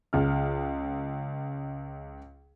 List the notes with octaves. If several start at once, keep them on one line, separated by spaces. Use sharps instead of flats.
C#2 F6